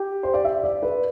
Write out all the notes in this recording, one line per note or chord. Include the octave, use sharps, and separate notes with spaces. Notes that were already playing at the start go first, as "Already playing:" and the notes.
Already playing: G4
C5
D5
E5
D5
B4